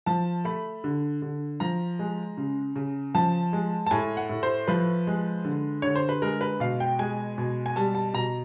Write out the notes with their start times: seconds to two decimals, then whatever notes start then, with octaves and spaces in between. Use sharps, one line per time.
0.06 F3 A5
0.45 A3 B5
0.84 D3
1.22 D3
1.60 F3 A#5
1.99 G#3
2.37 C#3
2.76 C#3
3.15 F3 A5
3.53 G#3
3.86 A5
3.91 A2 G#5
4.17 F#5
4.29 A2
4.43 C5
4.68 F3 B4
5.07 G#3
5.45 D3
5.82 D3 C#5
5.95 C5
6.09 B4
6.22 G#3 A#4
6.41 B4
6.60 B2 F5
6.80 G5
6.99 G#3 G#5
7.38 B2
7.66 G#5
7.76 G3 A5
7.95 A5
8.14 B2 A#5